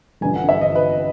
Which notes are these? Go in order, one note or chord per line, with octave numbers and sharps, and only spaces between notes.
A1 G2 D3 F3 G#5
F#5
E5
D#5
B4